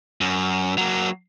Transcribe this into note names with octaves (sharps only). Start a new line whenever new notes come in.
F#2
F#3 A#3